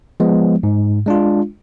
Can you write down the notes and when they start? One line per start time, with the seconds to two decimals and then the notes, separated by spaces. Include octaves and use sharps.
0.20 F3 G#3 B3
0.63 G#2
1.06 G#3 D4 F4